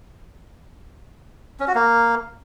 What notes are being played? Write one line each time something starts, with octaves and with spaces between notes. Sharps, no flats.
C#4
F#4
A#3